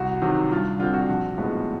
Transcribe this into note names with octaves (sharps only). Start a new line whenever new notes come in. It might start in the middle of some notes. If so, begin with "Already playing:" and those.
Already playing: C2 F#4
C3 D#3 F#3
G2 F4
D3 G3 C4 F4
F#4
A#1
A2 F3 G#3 B3